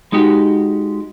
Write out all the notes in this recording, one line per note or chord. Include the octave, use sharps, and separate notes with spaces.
G#3 D#4 F#4 G4